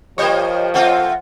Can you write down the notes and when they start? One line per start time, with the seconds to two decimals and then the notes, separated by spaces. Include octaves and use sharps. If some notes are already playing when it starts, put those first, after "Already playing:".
0.18 F3 G3 A#3 C#5 D#5 G5
0.74 A3 C4 F4 F#5